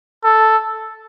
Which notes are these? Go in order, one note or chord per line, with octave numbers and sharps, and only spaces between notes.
A4